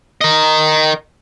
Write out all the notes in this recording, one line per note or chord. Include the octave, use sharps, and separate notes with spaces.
A#4 D#5